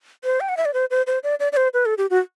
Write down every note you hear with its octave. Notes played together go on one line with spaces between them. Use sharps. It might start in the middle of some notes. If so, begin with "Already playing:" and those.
C5
G5
F#5
E5
D5
C5
C5
C5
D5
D5
D5
C5
B4
A4
G4
F#4